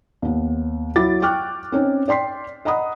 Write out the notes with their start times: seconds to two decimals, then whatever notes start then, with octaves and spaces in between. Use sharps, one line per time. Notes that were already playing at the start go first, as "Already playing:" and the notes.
0.22 D#2 B3
0.96 F#3 E4 D6 A6
1.22 G5 C#6 D6 F6 F#6
1.72 C4 C#4 D#4
2.08 D5 G5 C6 B6 C7
2.65 D#5 F#5 A#5 B5 D#6